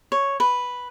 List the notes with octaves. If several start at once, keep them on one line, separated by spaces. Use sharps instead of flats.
C#5
B4